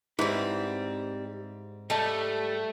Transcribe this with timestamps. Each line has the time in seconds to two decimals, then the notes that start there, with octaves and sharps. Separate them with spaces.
0.19 G#2 G3 C4 E4 B4
1.90 G3 A3 D#5 A5